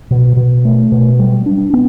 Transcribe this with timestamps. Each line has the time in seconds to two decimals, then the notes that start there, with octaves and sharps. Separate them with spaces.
0.11 B2
0.37 B2
0.65 A3
0.92 B2
1.19 G3
1.46 D4
1.73 B3